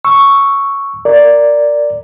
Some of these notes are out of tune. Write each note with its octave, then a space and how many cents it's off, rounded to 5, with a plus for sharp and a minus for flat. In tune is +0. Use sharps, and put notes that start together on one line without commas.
C#6 +0 E6 +0
A#4 +0 D5 +0